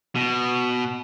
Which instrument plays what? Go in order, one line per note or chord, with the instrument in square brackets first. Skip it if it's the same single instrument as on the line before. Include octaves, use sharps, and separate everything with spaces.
[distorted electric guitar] B2